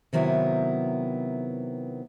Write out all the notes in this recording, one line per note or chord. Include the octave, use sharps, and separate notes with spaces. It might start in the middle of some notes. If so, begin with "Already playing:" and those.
C3 D#3 F#3 B3 E4